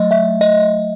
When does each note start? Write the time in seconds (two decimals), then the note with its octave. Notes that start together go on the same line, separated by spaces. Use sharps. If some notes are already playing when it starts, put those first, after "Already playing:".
Already playing: F#3 A3 D#5
0.11 E5
0.41 D#5